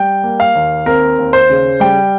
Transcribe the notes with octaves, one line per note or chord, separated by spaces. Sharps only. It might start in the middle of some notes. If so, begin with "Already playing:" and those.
Already playing: G3 G5
A#3
F5
D#2
C4 A#4
D#2
C5
C#3
G3 G5